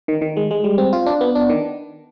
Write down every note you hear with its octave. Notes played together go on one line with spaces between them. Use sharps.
D#3
D#3
G#3
G#3
G3
C4
F4
D4
B3
D4
D#3